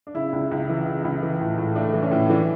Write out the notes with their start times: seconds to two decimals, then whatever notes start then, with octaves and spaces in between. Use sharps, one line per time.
0.07 D4
0.14 C#3 E4
0.33 C#2
0.51 C#2
0.69 E3
0.86 C#3
1.05 C#2
1.23 E3
1.41 A2
1.58 A2
1.75 A3 D4
1.94 E3
2.03 C#4
2.11 A2
2.29 E3 D4